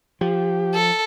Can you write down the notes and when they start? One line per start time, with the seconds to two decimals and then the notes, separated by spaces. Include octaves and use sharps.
0.21 F3 G4
0.74 A4